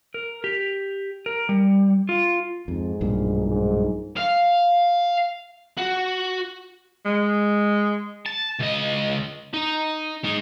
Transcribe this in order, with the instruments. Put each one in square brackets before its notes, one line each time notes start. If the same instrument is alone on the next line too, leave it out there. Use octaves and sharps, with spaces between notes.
[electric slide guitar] A#4
G4
A#4
G3
F4
[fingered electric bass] F2 [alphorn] G#2
[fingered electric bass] B1 G2 A#2
[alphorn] G#2
[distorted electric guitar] F5
F#4
[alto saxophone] G#3
[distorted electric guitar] A5
C#2 D#5
D#4
G#3 D#4